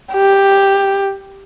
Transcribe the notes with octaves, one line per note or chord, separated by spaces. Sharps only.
G4